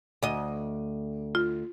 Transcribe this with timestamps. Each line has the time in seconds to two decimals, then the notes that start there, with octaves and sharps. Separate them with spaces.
0.22 D2 D#5
1.35 F4